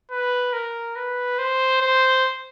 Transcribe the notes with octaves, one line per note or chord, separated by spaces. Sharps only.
B4
A#4
B4
C5
C5